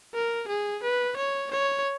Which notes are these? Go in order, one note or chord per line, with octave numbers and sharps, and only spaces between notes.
A#4
G#4
B4
C#5
C#5